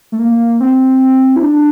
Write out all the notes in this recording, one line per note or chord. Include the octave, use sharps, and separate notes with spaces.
A3
A#3
C4
E4
D4